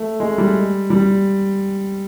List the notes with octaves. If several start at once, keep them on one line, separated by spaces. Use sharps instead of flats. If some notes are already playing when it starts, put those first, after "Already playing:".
Already playing: A3
G#3
G3
G3